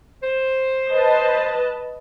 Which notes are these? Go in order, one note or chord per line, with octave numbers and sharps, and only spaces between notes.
C5
B4 D#5 A5